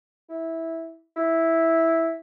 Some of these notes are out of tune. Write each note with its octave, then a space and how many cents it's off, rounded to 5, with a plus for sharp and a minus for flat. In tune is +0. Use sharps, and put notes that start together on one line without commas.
E4 -10
E4 -5